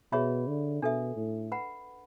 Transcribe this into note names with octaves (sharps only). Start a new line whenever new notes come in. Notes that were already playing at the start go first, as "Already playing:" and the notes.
B2 G#4 C#5 E5 B5
D3
B2 D4 A4 E5
A2
B4 F#5 B5